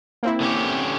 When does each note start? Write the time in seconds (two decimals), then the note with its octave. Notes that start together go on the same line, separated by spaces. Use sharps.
0.23 A#3 C4 E4
0.40 D3 C#4 G4